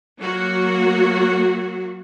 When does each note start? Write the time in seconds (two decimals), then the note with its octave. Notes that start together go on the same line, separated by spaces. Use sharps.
0.19 F#3 A#3 F#4